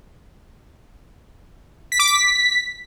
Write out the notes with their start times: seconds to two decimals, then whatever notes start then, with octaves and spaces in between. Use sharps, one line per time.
1.92 B6
1.99 D6
2.07 B6